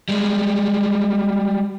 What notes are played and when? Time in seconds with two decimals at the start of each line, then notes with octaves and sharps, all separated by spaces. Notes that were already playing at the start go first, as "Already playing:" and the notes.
0.09 G3 G#3